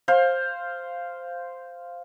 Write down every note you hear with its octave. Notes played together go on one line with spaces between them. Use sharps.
C5 F5